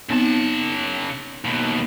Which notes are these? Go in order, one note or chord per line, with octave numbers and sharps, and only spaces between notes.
C#3 B3 C4 D#4 A5
D#2 B2